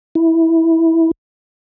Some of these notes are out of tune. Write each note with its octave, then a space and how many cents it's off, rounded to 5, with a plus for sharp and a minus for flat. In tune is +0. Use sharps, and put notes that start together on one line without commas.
E4 -10